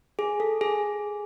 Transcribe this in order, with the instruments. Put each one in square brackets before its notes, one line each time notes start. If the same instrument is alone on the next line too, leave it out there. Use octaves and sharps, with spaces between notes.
[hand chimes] G#4
A4
G#4